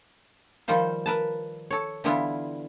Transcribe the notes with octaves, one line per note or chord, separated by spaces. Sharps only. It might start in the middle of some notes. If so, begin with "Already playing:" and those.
D#3 F3 G3 F4 C5
A#4 B4 A5
A4 C#5
D3 E3 G3 B3 E4 F4